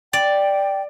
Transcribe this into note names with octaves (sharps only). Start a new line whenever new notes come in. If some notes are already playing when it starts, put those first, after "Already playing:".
D5 G5